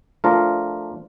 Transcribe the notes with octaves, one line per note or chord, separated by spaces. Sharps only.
F3 A3 D4 F4 A#4